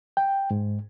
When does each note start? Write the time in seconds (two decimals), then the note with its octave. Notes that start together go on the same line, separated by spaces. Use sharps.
0.17 G5
0.51 G#2